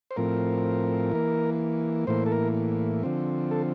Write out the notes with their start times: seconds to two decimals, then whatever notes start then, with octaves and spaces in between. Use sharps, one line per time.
0.11 C5
0.16 A2 F3 C4 A#4
1.11 E3 A#3
2.07 A2 E3 A#3 C5
2.26 A4
2.32 A#4
3.03 D3 F3 C4
3.51 A4